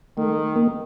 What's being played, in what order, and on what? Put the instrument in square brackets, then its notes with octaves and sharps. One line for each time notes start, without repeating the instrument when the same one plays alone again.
[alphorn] D#3 [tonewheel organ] A3
[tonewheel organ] A#3